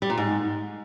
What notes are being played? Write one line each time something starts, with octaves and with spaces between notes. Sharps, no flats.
G3
A#2
G#2